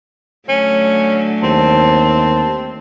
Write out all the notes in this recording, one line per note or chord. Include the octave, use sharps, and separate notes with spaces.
D3 F#3 A3 C#4
D#2 C4 A5